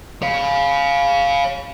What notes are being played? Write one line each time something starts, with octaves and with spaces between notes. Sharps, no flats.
C#5 F5